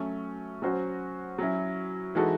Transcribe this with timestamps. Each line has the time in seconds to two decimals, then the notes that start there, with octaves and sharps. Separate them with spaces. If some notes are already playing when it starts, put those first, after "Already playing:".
Already playing: F#3 A3 C#4
0.62 F#3 C#4 F#4 C5
1.38 F#3 C#4 E4
2.15 E3 G#3 D#4 F#4 A4